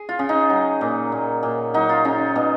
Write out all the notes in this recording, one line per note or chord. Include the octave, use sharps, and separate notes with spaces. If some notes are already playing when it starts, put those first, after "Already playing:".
Already playing: G#4
F4
C#3
D#4
F#3
A#2
A#2
A#2
F#3 D#4
F4
C#3 D#4
B2